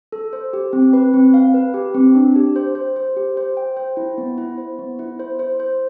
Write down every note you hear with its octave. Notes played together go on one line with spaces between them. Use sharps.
A4
C5
G4
C4
B4
C4
F5
B4
G4
C4
D4
G4
C5
C5
C5
G4
C5
G5
C5
E4
B3
E4
C5
B3
E4
C5
C5
C5